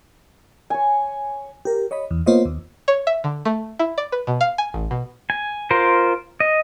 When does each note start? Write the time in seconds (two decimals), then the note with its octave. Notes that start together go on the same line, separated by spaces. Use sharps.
0.70 C#5 G#5
1.65 G4 A#4
1.91 C#5 D#5 B5
2.11 E2
2.26 A#3 B3 F4 C5 C#5 D#5
2.45 D#2
2.88 C#5
3.07 E5
3.24 D3
3.45 A3
3.79 E4
3.98 D5
4.12 B4
4.27 B2
4.41 F5
4.58 G#5
4.74 A1
4.91 B2
5.30 G#5
5.71 F4 A#4 C5
6.40 D#5